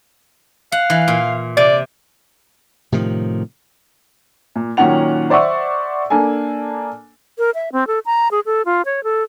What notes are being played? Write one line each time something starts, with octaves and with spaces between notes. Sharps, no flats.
F5 F#5
E3
A#2
C3 D5
A2 C3 D#3 F3
A#2
A#2 D#3 F#3 C#4 F#5 F7
C5 D5 E5 F#5 C#6 E6
A#3 D4 A4 G#5
A#4
E5
C4
A4
A#5
G#4
A4
F4
C#5
A4